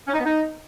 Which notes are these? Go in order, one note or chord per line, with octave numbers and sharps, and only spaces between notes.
C#4
D#4
B3
D#4